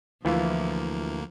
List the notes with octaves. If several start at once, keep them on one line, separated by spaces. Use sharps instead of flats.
D2 E3 F3 A#3 E4 F4